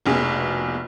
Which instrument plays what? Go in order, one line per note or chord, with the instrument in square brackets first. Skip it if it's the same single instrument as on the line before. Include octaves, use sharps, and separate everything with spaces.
[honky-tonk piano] F1 A#1 B2 G#4